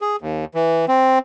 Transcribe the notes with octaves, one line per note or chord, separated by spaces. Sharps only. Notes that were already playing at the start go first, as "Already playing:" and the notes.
G#4
D#2
E3
C4